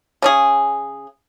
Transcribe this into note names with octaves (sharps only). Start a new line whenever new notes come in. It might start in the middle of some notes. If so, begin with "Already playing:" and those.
C#3 C#4 G#4